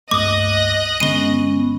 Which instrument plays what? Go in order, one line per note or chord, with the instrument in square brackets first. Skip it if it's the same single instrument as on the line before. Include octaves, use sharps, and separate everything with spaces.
[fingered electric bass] C#2 G2 A3 [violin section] D#5 F#6 A#6 [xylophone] D6 D#6
[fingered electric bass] G2 D3 [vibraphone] G#3 B3 C#4 [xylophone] D#7 G7